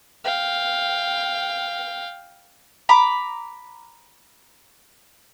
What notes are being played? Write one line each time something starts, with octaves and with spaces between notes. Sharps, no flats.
F5 G5
A#5 B5 D6